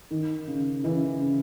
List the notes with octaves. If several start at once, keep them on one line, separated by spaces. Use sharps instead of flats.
D#3
C#3
C#3 E3
C#3